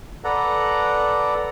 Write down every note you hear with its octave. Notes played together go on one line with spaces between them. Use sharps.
A4 B4 D5 F#5 A#5